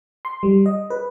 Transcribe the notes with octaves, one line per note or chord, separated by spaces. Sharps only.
C6
G3
D#5
B4